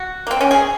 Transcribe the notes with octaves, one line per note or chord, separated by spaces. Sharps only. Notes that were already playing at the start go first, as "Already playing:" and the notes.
Already playing: F#4
A#3
C4
C#4
G#4